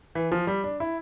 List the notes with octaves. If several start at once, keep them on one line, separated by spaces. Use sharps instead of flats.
E3
F3
G3
D4
E4